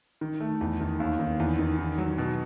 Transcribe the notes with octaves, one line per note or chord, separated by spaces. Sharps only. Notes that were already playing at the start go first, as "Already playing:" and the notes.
D#3
A3
E2
D#3
D#2
D#3
E2
D#3
D#3
F#3
B2